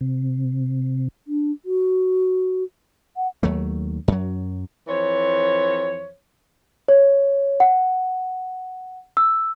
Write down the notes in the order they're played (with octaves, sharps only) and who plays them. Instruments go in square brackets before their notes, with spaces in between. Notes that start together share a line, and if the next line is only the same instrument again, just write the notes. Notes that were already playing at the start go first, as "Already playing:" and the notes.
[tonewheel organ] C3
[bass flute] D4
F#4
F#5
[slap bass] D#2 F#3 A3
F#2 F#3
[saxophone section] F2 E3 C5 C#5
[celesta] C#5
F#5
E6